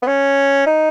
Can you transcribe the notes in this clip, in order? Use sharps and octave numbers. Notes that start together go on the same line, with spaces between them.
B3
C#4
D#4